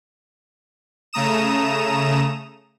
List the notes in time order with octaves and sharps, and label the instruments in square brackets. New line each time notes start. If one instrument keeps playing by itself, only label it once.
[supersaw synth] C#3 A3 A#5 D#6 E7